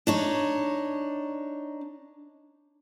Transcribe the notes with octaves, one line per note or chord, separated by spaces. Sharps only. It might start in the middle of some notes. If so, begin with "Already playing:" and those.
D4 D#4 C#5